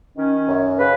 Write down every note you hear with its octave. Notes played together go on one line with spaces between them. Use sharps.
D#3 C#4
F#2
C#3 B4